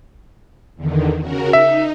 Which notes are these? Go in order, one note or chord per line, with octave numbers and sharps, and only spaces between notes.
E2 D3 D#3
C#3 F#4 A#4
D#4 E5